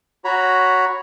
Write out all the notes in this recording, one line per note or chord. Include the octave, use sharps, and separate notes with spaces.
F#4 C#5 A#5 B5